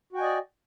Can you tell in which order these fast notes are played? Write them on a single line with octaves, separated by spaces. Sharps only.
F#4 G5 G#5 D#5 D5